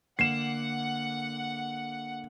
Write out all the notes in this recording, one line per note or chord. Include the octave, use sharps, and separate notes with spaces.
D3 A#3 F#5 C7 E7